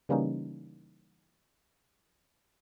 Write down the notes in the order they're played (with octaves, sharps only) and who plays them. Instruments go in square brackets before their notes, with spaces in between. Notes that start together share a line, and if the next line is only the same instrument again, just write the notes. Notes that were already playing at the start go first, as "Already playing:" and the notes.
[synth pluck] C#3 E3 G3 A#3 C#4 D#4